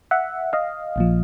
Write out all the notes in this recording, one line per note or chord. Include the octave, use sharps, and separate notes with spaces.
E5 F#5
D#5 F5
A#1 A#2 F3